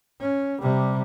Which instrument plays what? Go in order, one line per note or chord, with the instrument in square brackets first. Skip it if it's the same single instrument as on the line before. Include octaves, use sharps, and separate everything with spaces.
[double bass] C#4
C3 G3